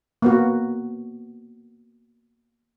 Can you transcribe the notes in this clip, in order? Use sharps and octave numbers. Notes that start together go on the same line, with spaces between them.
A#3 B3 F#4